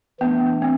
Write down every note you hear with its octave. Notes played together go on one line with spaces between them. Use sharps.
E3 A3 B3 D4
C4